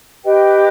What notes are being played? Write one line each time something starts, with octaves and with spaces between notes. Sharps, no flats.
G4 B4 D#5 G5